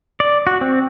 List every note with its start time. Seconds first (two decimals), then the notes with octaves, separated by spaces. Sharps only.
0.20 D5
0.47 F#4
0.61 C4